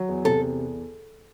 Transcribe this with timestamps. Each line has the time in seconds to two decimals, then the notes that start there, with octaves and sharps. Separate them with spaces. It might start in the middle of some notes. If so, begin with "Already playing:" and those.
Already playing: F#3
0.09 E2
0.25 C3 A4
0.42 E2